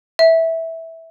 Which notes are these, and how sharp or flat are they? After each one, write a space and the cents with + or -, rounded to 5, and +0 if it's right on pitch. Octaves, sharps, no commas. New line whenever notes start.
E5 -10